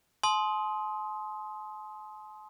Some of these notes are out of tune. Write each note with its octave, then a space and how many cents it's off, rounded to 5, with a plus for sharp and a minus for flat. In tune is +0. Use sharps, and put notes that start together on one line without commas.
A5 -45 C6 +0 D#6 +20